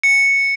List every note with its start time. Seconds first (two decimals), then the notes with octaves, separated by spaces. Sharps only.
0.03 C#7